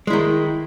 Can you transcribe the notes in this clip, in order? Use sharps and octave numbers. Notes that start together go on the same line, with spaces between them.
D#3 G#3 E4